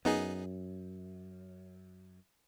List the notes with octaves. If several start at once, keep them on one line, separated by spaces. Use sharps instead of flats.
F#2 B3 D#4 G#4